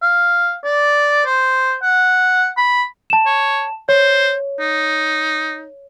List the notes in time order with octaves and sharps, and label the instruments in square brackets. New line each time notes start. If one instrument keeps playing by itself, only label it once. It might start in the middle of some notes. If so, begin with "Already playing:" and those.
[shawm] F5
D5
C5
F#5
B5
[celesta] A5 E7
[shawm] C#5
[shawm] C5 [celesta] C#5
[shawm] D#4